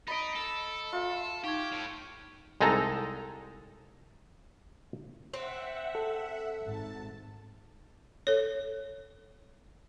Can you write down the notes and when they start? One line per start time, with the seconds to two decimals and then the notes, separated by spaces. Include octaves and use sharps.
0.08 D#4 D#5 B5 A6 B6 D7
0.36 A4
0.92 F4 E5
1.44 D#4 G4 C#6 G#6
1.72 A2
2.61 C2 G#3 D#4 A4 A#5
5.34 C4 E5 F#5
5.95 A4
6.64 G#1 A5
8.27 A4 C#5